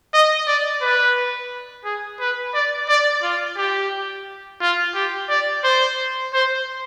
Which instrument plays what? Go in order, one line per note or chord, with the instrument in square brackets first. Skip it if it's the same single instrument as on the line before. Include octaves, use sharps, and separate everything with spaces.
[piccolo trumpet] D#5
D5
B4
G#4
B4
D5
D5
F4
G4
F4
G4
D5
C5
C5